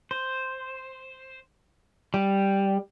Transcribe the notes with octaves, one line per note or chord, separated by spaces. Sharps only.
C5
G3